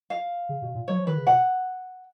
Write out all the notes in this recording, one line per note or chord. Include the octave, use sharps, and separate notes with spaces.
F5
C#3
B2
A#2
F#3 C#5
F3
D#3 B4
C#3
B2 F#5